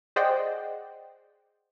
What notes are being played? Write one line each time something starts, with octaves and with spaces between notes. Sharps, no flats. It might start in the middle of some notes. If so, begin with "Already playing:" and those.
G#4 C5 D5 D#5 F#5 G5